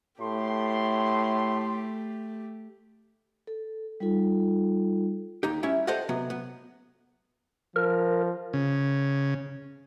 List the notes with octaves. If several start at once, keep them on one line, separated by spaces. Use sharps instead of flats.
A2 A3 G4 C6
A4
G3 D#4 F4 A4
D#2 D#4 G4
G3 C#4 E4 G4 E5
G4 A4 C5 D5 D#5 F#5
C3 F#3 B3
B3
F3 A#4
C#3